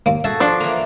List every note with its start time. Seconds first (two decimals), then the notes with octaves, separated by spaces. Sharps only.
0.06 D#2 A#3
0.24 F#4 G#4 A4 E5
0.40 F3 D4 C6
0.60 E3 A#3